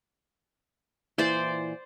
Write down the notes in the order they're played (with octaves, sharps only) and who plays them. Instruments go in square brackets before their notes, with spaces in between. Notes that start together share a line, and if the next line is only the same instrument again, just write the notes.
[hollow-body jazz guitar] A#2 E3 E4 [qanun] C5 D5 C6